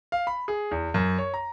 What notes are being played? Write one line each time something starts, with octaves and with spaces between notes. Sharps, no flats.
F5
B5
G#4
E2
F#2
C#5
A#5